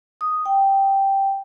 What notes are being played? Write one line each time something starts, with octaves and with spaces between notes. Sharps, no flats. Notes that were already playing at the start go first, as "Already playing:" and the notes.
D#6
G5